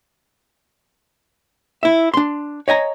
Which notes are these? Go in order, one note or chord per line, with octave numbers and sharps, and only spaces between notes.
E4 E5
D4 C6
C#5 D#5 G#5 A#5